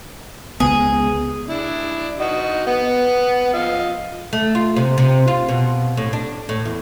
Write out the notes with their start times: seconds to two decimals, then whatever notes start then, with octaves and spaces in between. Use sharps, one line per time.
0.60 C#2 B3 G#4
1.48 D4 E4
2.20 D#4 F#4 D#5
2.67 B3 F#5
3.53 F3 D#5 F5
4.33 A3
4.55 F4
4.76 C3
4.98 C3
5.28 F4
5.49 B2
5.97 A2
6.13 D4
6.49 A2
6.65 E2